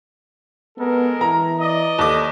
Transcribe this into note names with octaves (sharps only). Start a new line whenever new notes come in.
G#3 B3 A4 A#4
E3 A#5
D5 D#5
D#2 A4 D6